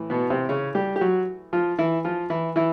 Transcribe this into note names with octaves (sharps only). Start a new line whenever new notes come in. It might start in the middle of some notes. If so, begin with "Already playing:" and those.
Already playing: A2 E3
B2 B3
C3 C4
C#3 C#4
G3 G4
G4
F#3 F#4
F3 F4
E3 E4
F3 F4
E3 E4
E3 E4